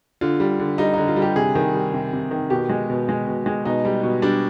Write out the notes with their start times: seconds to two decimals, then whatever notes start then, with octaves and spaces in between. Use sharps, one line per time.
0.21 D3 F4
0.40 G3
0.60 D3
0.78 G3 D#4
0.94 D3 D#4
1.08 F4
1.16 G3
1.22 G4
1.36 C3 G#4
1.55 D#3
1.74 G3
1.94 C3
2.13 C3
2.31 D#3
2.50 B2 G4
2.70 G#3
2.90 B2
3.09 G#3
3.27 B2
3.46 G#3
3.65 B2 D#4
3.85 G3
4.03 B2
4.22 G3 D4